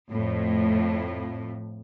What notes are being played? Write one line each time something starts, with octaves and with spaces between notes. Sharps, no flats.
F2 A2